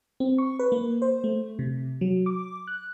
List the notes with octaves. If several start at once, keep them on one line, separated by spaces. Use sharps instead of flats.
C4
C#6
B4
A#3
C5
A3
C3
F#3
D6
F#6